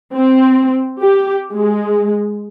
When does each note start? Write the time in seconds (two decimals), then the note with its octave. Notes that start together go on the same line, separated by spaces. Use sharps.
0.14 C4
1.01 G4
1.52 G#3